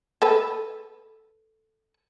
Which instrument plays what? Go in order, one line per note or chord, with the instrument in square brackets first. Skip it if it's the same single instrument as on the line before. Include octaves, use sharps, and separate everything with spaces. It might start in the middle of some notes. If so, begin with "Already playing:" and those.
[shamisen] A4 B4